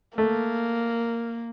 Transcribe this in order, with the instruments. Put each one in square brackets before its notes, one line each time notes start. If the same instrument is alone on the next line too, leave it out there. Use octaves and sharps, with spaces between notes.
[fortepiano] A3 [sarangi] A#3